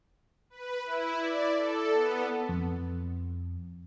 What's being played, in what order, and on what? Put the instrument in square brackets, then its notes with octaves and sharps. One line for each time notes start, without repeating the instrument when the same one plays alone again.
[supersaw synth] B4
E4
D5
A4
B3
[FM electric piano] F2